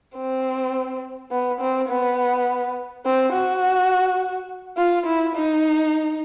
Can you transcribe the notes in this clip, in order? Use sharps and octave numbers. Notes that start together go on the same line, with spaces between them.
C4
B3
C4
B3
C4
F#4
F4
E4
D#4